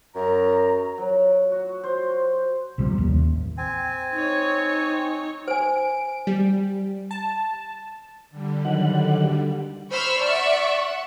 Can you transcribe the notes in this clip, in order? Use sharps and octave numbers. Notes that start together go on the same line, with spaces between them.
F#2 A#5
F#3
F#4
C5
B1 C3 F3 G3
A1 D#2
C4 G#5
D#4 C#5
C5 G#5 D7
G3
A5
D3 G3
D#3 F#3 F#5
C5 B5 C#6 E6 F6
D5 E5 F#5 C#6
F#5